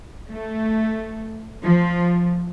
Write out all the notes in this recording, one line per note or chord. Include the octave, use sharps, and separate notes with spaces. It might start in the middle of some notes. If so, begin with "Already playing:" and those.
A3
F3